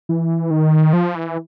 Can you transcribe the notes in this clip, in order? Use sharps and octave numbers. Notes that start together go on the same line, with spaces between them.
E3
D#3
F3
E3